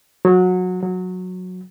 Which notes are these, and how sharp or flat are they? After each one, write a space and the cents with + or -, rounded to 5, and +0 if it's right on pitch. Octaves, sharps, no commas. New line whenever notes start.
F#3 -20
F#3 -15